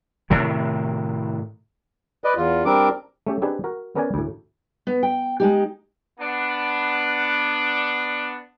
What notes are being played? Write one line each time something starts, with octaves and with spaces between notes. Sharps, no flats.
A2 C3 D#3
B4 D5 D#5
E2 F4
G3 C4 D4 A#4 D6
A3 C#4 G4 A4
C4 D4 D#4 G4 G#4 B4
F#4 A#4
B3 C#4 A#4 B4 D5 G#5
D2 A2
B3
G5
G#3 D#4 G4
B3 D4